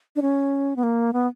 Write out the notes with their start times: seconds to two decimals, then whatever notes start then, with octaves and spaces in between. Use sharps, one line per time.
0.16 D4
0.22 C#4
0.76 B3
0.83 A#3
1.13 B3